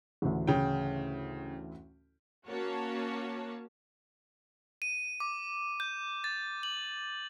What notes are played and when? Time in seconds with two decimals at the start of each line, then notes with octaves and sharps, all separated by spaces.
0.22 A1 D2
0.47 C#3 G5
2.47 A#3 C#4 F#4 C#5 A5
4.82 D#7
5.20 D6
5.80 G6
6.24 A6
6.63 F#7